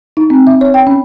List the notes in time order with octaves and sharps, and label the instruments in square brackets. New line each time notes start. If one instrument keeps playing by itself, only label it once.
[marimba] D#4
C4
E5
C#5
G5
C#4